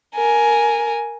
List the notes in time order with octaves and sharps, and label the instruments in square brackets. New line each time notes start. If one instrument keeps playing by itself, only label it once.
[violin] A#4 G#5